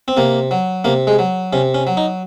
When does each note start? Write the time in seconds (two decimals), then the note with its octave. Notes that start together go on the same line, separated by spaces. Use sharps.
0.08 C4
0.17 C3 A#3
0.51 F#3
0.85 C3 A#3
1.07 G#3
1.19 F#3
1.53 C3 C#4
1.74 C#4
1.87 F#3
1.97 D#4